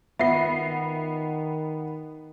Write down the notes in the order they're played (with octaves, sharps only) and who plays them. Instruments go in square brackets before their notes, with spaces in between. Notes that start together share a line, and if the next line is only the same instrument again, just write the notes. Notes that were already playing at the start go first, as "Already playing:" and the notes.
[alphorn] D#3 [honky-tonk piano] B3 C7 [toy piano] F4 E5